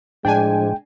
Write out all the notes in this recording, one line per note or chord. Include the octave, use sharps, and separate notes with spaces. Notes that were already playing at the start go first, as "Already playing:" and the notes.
A2 F3 G#3 D4 G5 G#5